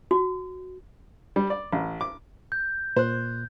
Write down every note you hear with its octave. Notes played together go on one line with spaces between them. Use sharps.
F#4
G3
D5
A1
D6
G6
A#2 C5 F#6